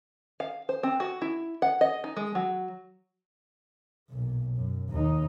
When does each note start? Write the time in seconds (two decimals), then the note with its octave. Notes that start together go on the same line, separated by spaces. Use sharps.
0.40 F5
0.69 C5
0.83 C4
1.00 F#4
1.22 E4
1.62 F#5
1.81 D#5
2.04 D#4
2.17 G#3
2.35 F#3
4.10 B1 A#2
4.56 F#2
4.90 D#2 D#4